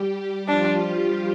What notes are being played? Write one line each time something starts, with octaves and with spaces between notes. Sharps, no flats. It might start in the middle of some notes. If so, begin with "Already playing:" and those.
Already playing: G3 G4
G3 G4
F3 D4 F4
G3 G4